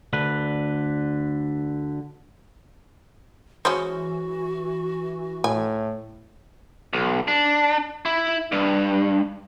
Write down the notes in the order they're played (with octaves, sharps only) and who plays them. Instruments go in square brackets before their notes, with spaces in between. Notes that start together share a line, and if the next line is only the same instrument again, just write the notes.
[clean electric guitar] D2 D3 B4
[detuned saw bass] E3 [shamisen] G#3 C#4 C5 [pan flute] F#4
[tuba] A2 [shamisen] G#5
[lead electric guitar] B1
D4
E4
G2